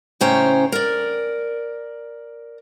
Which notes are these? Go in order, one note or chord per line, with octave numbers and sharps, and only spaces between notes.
A2 C#3 C#4 C5 G5 A#5
A#4 D5